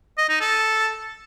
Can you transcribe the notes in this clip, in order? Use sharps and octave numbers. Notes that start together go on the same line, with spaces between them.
D#5
D#4
A4